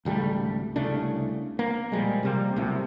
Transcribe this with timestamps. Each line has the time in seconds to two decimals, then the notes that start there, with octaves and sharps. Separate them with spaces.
0.05 G#1 C#2 G3 A3
0.76 C2 C#3 A3 D4
1.59 A#3
1.92 A#2 F3 G3 G#3
2.23 C3 G3 A#3
2.56 C2 A2 C3 F#3